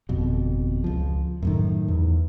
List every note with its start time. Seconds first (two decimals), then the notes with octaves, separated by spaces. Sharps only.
0.09 G1 F2 B2
0.84 C#2 F3
1.42 F#2 A2 D#3
1.88 E2